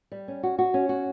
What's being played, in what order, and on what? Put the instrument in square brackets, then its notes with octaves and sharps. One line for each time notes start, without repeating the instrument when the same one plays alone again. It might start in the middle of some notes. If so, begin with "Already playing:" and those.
[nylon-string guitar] G3
C#4
F#4
F#4
C#4
F#4